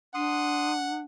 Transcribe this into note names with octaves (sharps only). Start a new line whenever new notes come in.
D4 F#5 C6 D#6